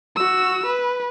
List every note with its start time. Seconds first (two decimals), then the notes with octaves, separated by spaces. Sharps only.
0.16 F#4 E6
0.66 B4